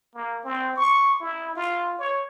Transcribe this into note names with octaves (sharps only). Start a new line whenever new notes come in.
A#3
C4
C#6
E4
F4
C#5